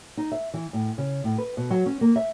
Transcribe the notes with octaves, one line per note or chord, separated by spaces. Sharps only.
D#4
E5
E3
A2
C#3
A2
B4
B2
F#3
C#4
A#3
E5